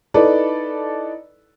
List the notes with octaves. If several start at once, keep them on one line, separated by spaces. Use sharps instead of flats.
D#4 E4 A4 B4 D5